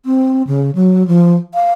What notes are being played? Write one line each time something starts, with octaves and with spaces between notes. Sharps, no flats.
C4
C#3
F#3
F3
F5